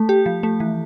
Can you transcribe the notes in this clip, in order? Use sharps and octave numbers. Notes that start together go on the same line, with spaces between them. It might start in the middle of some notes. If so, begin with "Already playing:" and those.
Already playing: A3
G4
F3
A3
E3